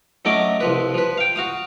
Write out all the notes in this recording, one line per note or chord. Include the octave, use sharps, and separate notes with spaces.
F#3 A3 C#4 D#5 D6
C2 F3 B4
F3 B4
F5 G5
F#4 F5 D#6